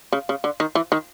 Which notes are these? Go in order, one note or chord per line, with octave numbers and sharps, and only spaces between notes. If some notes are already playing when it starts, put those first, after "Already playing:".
C#3
C#3
D3
D#3
E3
D#3